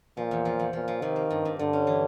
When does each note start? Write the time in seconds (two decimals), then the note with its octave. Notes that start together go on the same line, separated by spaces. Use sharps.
0.17 A#2 F3
0.31 E2
0.45 F3
0.60 E2
0.73 A#2 F3
0.88 F3
1.02 C3 D#3
1.16 A#3
1.30 G2
1.45 G2
1.59 G2 D3
1.73 C#4
1.87 E3